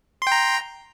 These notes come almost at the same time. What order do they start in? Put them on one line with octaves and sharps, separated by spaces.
C6 G5 A#5